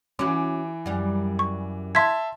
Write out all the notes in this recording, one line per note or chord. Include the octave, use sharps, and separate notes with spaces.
E3 C#4 F#4 D6
F#2 G3
C#6
E5 A5 C6 G#6 B6